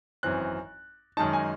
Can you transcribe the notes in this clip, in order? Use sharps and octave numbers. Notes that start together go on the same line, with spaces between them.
G#1 F#2 E3 C4 F#6
F#2 D#3 G#3 D#4 A5
G#5